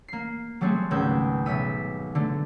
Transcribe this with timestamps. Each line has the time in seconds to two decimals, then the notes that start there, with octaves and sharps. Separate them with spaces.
0.08 A#3 C7
0.61 F#3 G3 A3 C4 F#4 G#4
0.91 G#1 C#2 G#3 B4 E6 G6
1.46 B1 E5 E6 B6 D#7
2.15 D3 A3